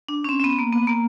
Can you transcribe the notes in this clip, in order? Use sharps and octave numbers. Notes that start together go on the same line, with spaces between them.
D4
C#4
C4
C4
B3
A#3
B3
A#3